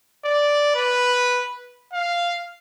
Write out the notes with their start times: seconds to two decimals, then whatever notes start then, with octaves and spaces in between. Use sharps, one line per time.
0.25 D5
0.76 B4
1.93 F5